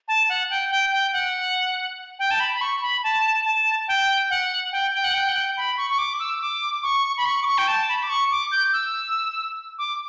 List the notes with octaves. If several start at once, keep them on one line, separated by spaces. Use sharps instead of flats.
A5
F#5
G5
G5
G5
F#5
G5
A5
B5
B5
C#6
B5
A5
A5
G5
F#5
G5
G5
F#5
G5
F#5
G5
B5
C#6
C#6
D6
E6
D6
C#6
B5
C#6
D6
C#6
G5
A5
B5
D6
C#6
D6
G6
E6
D6